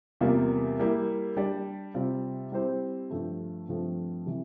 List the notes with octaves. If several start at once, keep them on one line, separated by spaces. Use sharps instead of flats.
E2 C3 G3 A#3 F4
G3 A#3 E4
G3 D4 G4 D5
C3 G3 C4 F4
G3 C4 E4 G4 C5
G2 F3 A3
G2 F3 A3 C4
C3 E3 G3